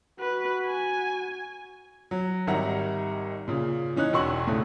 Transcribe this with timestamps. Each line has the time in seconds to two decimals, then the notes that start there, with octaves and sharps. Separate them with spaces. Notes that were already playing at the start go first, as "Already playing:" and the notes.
0.20 F#4 B4
0.67 G#5
2.11 F#3
2.47 G#1 D#3 G3 E5 F#5 A#5
3.48 A#2 C#3
3.96 E3 C#4 D#4 F#6
4.13 E1 F#4 C6 C#6 E6 F#7
4.47 A2 C#3 A3